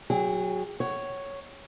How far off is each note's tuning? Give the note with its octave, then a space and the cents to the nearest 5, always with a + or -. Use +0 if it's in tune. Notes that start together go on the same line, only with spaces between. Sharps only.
F#3 +0 G#4 -25 G5 +0
C#5 +0 F#5 +30